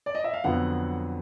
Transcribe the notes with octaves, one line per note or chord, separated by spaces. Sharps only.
D5
D#5
E5
F5
F2 D3 F#3 B3 F#5